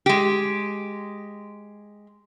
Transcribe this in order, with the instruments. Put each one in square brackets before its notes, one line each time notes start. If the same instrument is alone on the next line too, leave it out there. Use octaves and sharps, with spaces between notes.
[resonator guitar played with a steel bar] G#3 G4